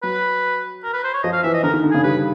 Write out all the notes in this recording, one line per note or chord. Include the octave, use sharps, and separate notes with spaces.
F#3 B4
A#4
B4
C5
C#5
F3 D#5
F5
E3 E5
D#5
D3 A#4
D#3
D3
C#3 G#4
G3 B4